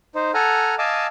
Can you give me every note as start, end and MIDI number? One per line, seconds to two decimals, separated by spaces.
0.15 0.32 63
0.15 0.32 72
0.34 0.75 69
0.34 0.75 78
0.34 0.75 80
0.34 0.75 82
0.34 0.75 89
0.79 1.07 75
0.79 1.07 77
0.79 1.07 80
0.79 1.07 81
0.79 1.07 86
0.79 1.07 88